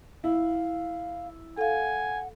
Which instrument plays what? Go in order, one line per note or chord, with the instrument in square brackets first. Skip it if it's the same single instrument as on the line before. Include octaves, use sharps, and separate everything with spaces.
[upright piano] E4 [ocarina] F5
[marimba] A4 F5 [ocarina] F#5 [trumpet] G#5